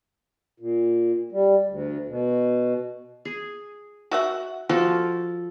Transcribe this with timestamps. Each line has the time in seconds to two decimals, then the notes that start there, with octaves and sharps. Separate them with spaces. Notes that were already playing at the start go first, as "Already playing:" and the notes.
0.60 A#2
1.32 G3
1.68 D2
2.08 B2
3.25 G#4
4.11 F#4 E5 F#5
4.69 F3 F#4 A4